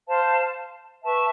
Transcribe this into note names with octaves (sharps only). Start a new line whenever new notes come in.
C5 F5 A5
B4 E5 A5 C#6